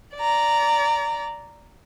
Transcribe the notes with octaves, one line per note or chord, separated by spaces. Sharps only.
D5 A#5